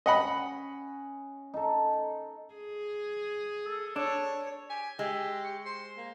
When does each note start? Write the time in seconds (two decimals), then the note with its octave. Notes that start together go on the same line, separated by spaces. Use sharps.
0.06 C#4 D#5 F#5 B5
1.54 D#4 A4
2.54 G#4
3.66 A4
3.96 D4 C#5
4.70 G4 G#5
4.99 G#3 G4 E5
5.45 C#6
5.66 C5 C6
5.97 A#3